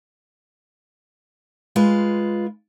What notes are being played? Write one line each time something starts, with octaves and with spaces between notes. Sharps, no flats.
G#3 F4 B4